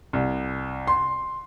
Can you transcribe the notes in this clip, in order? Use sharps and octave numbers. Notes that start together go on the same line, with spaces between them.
C2
C6